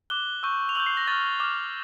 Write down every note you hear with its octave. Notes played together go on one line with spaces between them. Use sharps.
D6 F#6 G7
C#6 E6 G6
F7
C#6 E6 G6 F#7
C7
A#6
C#6 F6 A6
D6 F6